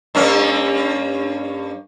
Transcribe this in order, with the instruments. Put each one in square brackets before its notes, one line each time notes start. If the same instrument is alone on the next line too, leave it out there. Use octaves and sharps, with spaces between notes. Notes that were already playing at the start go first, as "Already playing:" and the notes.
[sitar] G2 A#3 C#4